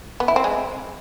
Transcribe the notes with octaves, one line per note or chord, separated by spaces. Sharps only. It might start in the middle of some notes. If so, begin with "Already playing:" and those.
B3
E4
C4
G#3